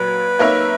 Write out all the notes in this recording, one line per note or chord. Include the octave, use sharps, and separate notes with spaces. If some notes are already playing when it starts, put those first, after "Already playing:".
Already playing: A#2 F#3 B4
A#3 D#4 A#4 C#5 E5